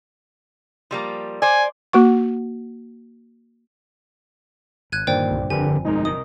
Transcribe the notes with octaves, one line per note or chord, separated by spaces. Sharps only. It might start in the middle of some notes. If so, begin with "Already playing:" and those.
F3 G3 A#3
C5 D5 G#5
A#3 F#4 F#5 C#6
G#1 F#6 G#6 D#7
G2 A#2 D3 D#3 A#3 C5 D5 G5
C2
G1 F2 D3 G4 A#4 B4 G#5
B1 G#3 D#4 A#4
C2 A#4 D#5 D#6